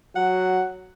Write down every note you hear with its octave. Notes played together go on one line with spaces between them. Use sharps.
F#3 F#5